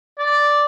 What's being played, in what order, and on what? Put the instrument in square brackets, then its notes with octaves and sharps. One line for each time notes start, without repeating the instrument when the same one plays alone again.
[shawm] D5